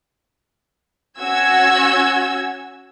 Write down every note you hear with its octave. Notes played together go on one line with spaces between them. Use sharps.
C#4 F#4 E6 G#6